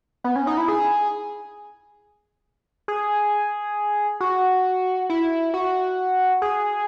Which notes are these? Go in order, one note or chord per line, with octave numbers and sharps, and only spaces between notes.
B3
C#4
D#4
E4
G#4
G#4
F#4
E4
F#4
G#4